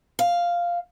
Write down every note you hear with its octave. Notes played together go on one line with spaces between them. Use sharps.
F5